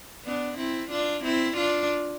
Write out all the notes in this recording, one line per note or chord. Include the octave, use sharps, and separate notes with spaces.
B3 D4
C4 E4
D4 F4
C4 E4
D4 F4